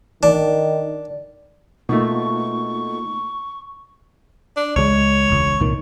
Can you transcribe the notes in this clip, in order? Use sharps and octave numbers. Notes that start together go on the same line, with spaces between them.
D#3 D4
B2 A3 A#3 D#4 F4 C#6
D4
C#2 G3 G#3 C#5
E1 C#2
C2 A#2 D#3